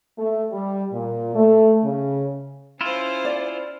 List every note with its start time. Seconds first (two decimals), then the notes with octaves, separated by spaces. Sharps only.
0.18 A3
0.52 G3
0.92 A#2
1.35 A3
1.83 C#3
2.81 C#4 E4 F4 C5
3.25 D5